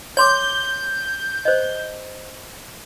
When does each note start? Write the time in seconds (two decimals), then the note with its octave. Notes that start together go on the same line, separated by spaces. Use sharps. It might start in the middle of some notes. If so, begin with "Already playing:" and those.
0.17 C#5 C6 D6 G6
1.45 C5 D#5